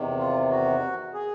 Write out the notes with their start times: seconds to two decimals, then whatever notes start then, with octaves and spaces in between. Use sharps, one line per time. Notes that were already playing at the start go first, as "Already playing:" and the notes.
Already playing: E2 C3 D#3
0.19 F4
0.50 F#4
1.14 G#4